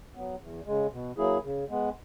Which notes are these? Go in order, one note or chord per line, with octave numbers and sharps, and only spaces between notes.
F#3 B3
E2
C#3 G#3
B2
F#3 A#3 E4 G#4
C#3
G#3 B3